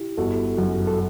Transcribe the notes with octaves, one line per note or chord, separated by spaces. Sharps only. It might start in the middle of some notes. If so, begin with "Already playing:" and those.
Already playing: E4 G4
G1 F#4 A4
F#2 F#3
A4